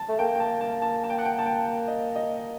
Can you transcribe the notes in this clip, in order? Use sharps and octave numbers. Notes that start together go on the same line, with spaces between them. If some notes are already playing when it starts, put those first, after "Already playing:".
Already playing: A5
A3
A#3 G5
G5
A5
A5
A5
A5
G5
F#5
G5
A5
G5
D#5
D#5